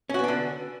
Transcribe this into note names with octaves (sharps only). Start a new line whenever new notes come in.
D3 B3 C#4 D4 F#4